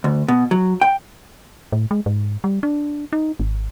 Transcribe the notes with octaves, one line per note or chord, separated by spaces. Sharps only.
D2
B2
F#3
G5
A2
G#3
G#2
G3
D4
D#4
G#1